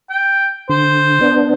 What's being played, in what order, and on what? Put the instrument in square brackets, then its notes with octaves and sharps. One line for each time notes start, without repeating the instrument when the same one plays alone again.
[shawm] G5
[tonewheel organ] D3 [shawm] C5
[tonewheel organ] B3 D4